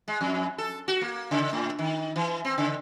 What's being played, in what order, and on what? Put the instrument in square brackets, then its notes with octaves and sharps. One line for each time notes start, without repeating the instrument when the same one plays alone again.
[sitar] G#3
F2
A4
F#4
A#3
C#3
A2
D#3
E3
C4
C#3